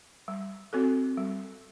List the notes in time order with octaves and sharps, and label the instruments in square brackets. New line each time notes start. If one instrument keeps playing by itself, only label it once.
[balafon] G3
C4 F#4 A4
G3